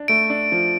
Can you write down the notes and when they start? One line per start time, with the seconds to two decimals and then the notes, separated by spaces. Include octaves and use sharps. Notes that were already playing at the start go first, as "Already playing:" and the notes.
Already playing: D4
0.08 A3 D7
0.30 D4
0.52 F3